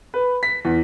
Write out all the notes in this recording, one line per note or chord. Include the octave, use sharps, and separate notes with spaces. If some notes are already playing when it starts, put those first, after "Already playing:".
B4
B6
E2